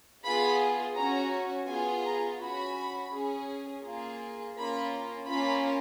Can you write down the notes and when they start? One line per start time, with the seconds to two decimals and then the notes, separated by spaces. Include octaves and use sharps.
0.24 B3 F4 G#4 B5
0.96 C#4 F#4 A#5
1.68 B3 F4 G#4 G#5
2.05 A#5
2.40 C#4 F#4 B5
3.12 C#4 G#4
3.84 A#3 F4 G#4
4.56 A#3 C#4 F4 B5
5.28 A#3 C#4 F4 B5